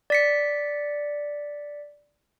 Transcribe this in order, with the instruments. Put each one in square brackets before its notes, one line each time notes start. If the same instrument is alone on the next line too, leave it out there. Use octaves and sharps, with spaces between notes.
[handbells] D5 B6 C#7